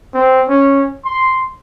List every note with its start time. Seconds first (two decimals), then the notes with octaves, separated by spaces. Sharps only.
0.14 C4
0.49 C#4
1.05 C6